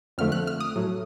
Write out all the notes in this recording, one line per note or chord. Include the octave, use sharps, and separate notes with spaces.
F2 D3 F3 A3 F6
F#6
F6
D#6
A2 F#3 A3